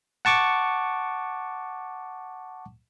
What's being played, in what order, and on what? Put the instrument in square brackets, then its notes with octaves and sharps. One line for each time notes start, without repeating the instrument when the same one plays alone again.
[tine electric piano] F#5 A5 C#6 D6